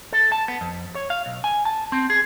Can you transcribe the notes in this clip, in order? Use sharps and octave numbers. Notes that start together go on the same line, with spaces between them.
A4
A5
B3
F2
C#5
F5
B1
G#5
A5
C4
G#4